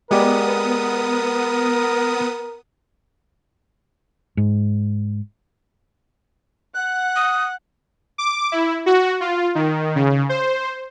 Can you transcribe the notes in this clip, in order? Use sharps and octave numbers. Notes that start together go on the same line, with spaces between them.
G#3 B3 G4 A#4 D5 D#6
G#2
F#5 F#6
D#6
D6
E4
F#4
F4
D#3
C#3
C5